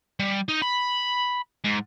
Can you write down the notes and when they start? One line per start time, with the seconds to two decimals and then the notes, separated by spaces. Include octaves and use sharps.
0.20 G3
0.49 D#4
0.62 B5
1.64 G#2